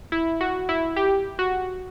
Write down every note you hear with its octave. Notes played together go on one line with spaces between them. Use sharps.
E4
F#4
E4
G4
F#4